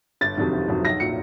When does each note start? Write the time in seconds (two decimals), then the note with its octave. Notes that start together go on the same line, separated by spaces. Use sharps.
0.21 G1 A6
0.37 F2 C3 D#3 F#3
0.52 G1
0.68 F2 C3 D#3 F#3
0.84 B1 A#6
1.00 A#2 F#3 C#7